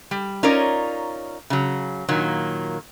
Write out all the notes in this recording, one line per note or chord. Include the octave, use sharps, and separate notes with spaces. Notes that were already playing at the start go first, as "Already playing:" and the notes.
G3
C#4 D#4 F4 A#4 C#5 D5
C#3 F#3
A#2 D#3 F#3 A#3